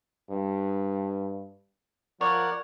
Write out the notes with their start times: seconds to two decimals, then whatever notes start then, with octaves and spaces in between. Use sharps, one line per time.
0.30 G2
2.21 F3 A#4 C#5 D5 F#5